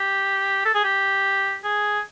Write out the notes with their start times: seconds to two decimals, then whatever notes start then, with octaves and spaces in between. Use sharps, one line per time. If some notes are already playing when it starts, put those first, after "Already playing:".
Already playing: G4
0.65 A4
0.74 G#4
0.84 G4
1.64 G#4